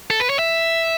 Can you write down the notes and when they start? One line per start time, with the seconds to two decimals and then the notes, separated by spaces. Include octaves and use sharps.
0.10 A4
0.20 B4
0.30 C#5
0.39 E5